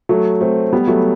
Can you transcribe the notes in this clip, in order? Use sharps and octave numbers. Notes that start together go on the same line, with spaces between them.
F#3 A3
A3 C4
G3 B3
F#3 A3